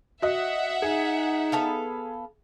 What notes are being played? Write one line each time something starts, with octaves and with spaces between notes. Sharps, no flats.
F#4 D#5 E5 F#5
D#4 G#4
B3 A4 F5